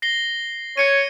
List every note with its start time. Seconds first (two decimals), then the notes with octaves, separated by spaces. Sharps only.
0.02 A#6 C7 G7
0.77 C#5 G#6 C#7 D#7